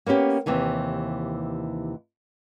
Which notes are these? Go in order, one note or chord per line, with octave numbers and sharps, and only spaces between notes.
A#3 B3 C#4 G4
D#2 C3 E3 G#5